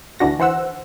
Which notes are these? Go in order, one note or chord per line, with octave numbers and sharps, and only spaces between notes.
D2 E3 D4 F#4 A#6
E3 C5 F#5 E6